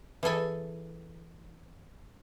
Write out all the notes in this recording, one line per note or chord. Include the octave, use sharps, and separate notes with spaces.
E3 G#4 A4 G#5